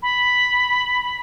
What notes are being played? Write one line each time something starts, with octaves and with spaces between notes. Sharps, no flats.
B5